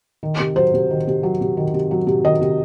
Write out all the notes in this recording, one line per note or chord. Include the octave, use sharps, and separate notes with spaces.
D#3
C3
F#3 C5
C3
D#3
C3
F#3
C3
D#3
C3
F#3
C3
D#3 D#5
C3